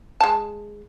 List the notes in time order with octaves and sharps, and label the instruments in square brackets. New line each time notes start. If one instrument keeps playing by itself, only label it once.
[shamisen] G#3 A5